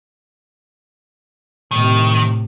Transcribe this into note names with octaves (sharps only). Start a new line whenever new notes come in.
A2 C3 D#3